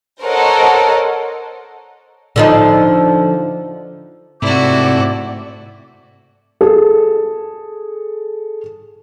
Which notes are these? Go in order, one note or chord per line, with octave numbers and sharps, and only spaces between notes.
A4 A#4 C5 C#5 D#5 F#5
D3 F3 D#4
G#2 C3 A3 E4 F#4 D5 E5 D6
G#4 A4